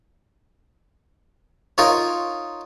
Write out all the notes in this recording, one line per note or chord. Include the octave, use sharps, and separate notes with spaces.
D#4 F4 A#4 C#5